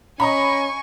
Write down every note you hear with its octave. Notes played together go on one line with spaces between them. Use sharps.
C#4 D#5 G#5 A#5 B5 C#6